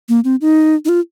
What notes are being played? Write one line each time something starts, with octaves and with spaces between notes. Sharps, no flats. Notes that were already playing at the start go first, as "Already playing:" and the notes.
A#3
C4
D#4
D#4
F4